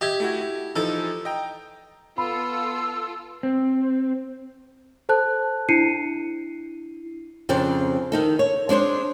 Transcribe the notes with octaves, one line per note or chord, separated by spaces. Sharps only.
G4 D#5 E5 G#6
A3 E4 F#4
E4
E3 F3 D#4 A4
D#5 G5 A#5
B3 F4 A4 B5 E6
C4
A4 C5 A5 F#6
D4 E4 C7 C#7 D#7
F2 C#3 C4 D4
D#3 D#4 A4
C#5
G#3 D4 C5 C#5